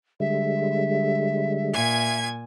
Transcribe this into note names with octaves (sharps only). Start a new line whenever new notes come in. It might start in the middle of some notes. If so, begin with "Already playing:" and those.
D3 G3 G#3 E5
A#2 G#5 G#6